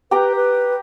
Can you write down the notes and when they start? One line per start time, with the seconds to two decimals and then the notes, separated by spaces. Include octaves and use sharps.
0.11 G4 B4 G5 A#5
0.35 B4